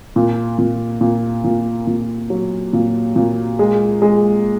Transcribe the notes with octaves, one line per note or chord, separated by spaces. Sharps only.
A#2
A#2
A#2
A#2
A#2
F#3
A#2
A#2
G#3
G#3